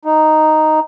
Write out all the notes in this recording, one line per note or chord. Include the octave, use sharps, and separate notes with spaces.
D#4